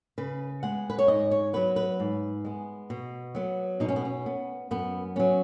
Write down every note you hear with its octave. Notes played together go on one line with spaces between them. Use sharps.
C#3 B4
G#3 B3 F#5
B4
C#5
G#2 D#5
C#5
F#3 B3 B4
B4
G#2
G#3 B3
B2
F#3 B3
B2 D#4
C#4
B3
C#4
B3
F#2 B3
F#3 B3 C#4